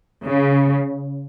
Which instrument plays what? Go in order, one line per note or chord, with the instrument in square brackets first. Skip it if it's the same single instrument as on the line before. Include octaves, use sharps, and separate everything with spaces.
[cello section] C#3